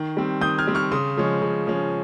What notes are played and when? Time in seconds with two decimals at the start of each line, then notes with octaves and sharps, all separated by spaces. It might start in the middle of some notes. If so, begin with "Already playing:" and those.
Already playing: D#3 C#6
0.17 G3 C4
0.41 D#3 D#6 G6
0.58 F6 G#6
0.67 G3 C4
0.75 C#6 F6
0.92 C#3 C6 D#6
1.17 F3 G#3 C#4
1.42 C#3
1.67 F3 G#3 C#4